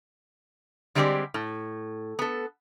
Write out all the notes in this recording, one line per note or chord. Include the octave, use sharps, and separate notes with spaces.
D3 G3 G#3 C4 G4 D5
A2
B3 A4